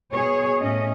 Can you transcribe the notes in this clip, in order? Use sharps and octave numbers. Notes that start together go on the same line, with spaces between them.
B2 G#4 C#5
A2 A3 C#4 D#5